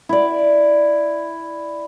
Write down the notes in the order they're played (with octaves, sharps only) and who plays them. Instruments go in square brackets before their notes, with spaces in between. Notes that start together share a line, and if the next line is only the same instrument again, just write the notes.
[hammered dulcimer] E4 D5